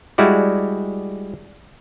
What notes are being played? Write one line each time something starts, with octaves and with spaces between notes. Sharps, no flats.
G3 G#3 E4 F#4 D5